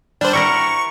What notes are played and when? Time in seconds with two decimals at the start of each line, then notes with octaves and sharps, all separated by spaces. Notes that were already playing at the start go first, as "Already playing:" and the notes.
0.21 G3 D4 C5
0.33 E4 A#4 F#5 C#6